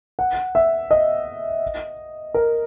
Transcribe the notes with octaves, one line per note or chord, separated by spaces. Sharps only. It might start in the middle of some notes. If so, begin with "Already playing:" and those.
F#5
E5
D#5
A#4